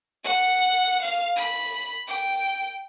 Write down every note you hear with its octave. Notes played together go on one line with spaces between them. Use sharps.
F#5
F5
B5
G5